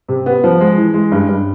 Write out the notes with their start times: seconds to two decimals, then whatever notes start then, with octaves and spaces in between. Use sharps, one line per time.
0.08 C3
0.26 B3
0.44 F3
0.61 G#3
0.77 E3
0.94 G#3
1.12 G2
1.29 G2